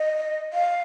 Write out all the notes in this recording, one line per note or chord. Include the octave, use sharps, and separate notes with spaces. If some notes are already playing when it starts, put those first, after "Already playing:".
Already playing: D#5
F5